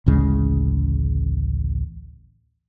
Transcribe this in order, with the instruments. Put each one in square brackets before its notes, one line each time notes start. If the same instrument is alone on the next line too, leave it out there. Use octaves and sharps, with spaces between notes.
[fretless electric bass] A1 D2 C#3 G#3